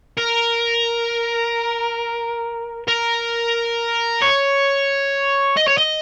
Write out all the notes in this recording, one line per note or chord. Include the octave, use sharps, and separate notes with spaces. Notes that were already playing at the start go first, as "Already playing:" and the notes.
A#4
A#4
C#5
D#5
C#5
D#5